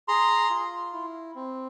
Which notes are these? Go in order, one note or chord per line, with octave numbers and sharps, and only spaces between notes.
G#4 A#5 C6
F4
E4
C4